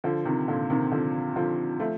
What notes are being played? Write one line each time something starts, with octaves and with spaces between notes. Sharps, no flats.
D3 F3
C3 D#3
A#2 D3
C3 D#3
D3 F3
D3 F3
F3 A3